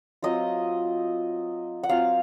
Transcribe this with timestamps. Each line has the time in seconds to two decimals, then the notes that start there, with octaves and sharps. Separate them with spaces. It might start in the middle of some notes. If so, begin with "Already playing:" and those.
0.22 F#3 C4 F4 D#5
1.83 F#5
1.89 F#3 C4 F4 F5